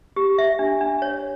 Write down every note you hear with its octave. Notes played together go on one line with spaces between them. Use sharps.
G4
E5
D4
D4
C#5